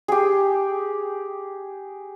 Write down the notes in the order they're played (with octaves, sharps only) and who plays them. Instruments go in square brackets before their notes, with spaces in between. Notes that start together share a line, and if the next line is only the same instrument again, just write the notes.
[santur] G4 G#4